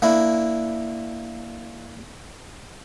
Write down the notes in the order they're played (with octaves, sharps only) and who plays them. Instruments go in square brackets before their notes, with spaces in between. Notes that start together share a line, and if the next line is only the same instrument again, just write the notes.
[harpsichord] A#3 D4 E4